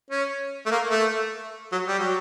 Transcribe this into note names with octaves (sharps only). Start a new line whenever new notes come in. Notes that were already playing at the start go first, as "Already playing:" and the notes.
C#4
A3
A#3
A3
F#3
G3
F#3